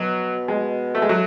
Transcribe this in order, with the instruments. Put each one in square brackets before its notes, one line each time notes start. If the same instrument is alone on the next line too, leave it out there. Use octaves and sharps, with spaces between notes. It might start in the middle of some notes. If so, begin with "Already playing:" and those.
Already playing: [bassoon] B2 [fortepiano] F#3
[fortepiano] G#3
A3
G#3
[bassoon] A2 [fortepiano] F#3